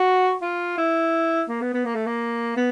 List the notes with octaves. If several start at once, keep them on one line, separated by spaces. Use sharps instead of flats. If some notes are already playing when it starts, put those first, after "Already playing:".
Already playing: F#4
F4
E4
A#3
B3
B3
A#3
A3
A#3
B3